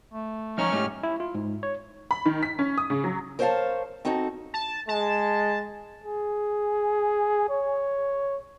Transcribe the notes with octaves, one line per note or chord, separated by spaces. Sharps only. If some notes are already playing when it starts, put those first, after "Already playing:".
A3
F3 C#4 D#4 C#5 A#5 C#6 F6
G#2 A3 D#4 G4
E4
F4
G#2
C#5
B5
D#3
B6
C#4
D#6
C#3
F#3
A#4 C5 C#5 D#5 F5 A5
C4 D#4 F#4 A4
A5
G#3 A5
G#4
C#5